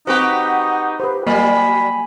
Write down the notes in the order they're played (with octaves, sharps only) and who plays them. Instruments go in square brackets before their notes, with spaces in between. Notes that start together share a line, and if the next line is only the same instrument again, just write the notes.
[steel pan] C4 C5 [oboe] D#4 [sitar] F#4 G4 B4 [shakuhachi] F#5
[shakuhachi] G4 [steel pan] B4 C5
[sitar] F#3 G3 [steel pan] A#3 D#5 [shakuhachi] G#5 [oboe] B5